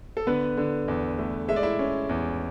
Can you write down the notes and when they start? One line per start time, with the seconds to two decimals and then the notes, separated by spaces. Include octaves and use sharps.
0.17 A4
0.27 D3 B3 B4
0.57 D3
0.88 E2
1.19 A3
1.48 G#3 E5
1.56 D5
1.63 E4 E5
1.79 C#4
2.09 E2